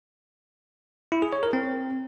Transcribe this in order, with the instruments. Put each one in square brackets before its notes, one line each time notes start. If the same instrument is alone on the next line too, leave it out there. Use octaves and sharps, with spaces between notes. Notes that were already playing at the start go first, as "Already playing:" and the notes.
[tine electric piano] E4
G#4
C#5
A#4
C4